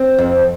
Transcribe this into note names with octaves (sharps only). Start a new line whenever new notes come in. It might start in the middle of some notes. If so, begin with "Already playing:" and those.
Already playing: C4
F2